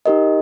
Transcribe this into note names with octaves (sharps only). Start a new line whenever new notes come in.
D#4 G4 A#4 D#5